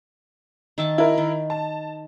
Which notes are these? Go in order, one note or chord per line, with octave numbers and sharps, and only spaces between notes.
D#3 E5 A5
E4 A#4
D#3
A5